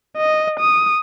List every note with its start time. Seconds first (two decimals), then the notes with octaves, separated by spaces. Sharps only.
0.17 D#5
0.60 D#6